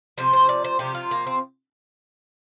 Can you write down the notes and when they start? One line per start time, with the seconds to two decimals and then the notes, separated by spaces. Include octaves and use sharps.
0.18 C3 F3 C5
0.33 C5
0.49 D5
0.64 C5
0.79 C3 F3 G4
0.95 F4
1.11 A#3
1.27 C4